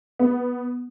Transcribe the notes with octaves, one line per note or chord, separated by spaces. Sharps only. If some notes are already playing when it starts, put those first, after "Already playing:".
B3